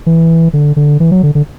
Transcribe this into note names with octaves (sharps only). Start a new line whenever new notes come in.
E3
D3
D3
E3
F#3
D3
D3